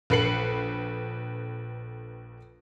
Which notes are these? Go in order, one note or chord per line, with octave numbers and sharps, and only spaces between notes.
A#1 A4 B4 C7 C#7 F#7